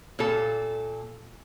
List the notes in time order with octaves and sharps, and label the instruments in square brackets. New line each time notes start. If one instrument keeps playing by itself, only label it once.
[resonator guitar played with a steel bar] A#2 A4